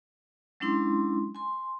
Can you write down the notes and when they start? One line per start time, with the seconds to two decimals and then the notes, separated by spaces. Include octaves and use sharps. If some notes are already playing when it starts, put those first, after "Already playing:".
0.60 F#3 G#3 C#4 D4 E4 C6
1.35 G#5 C6